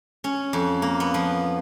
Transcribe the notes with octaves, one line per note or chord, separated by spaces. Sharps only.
C#4
F2
A#3
B3
F3